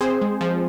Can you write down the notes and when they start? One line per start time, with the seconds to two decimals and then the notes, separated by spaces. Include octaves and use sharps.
0.01 C4 G#4 C5
0.21 G#3
0.41 F3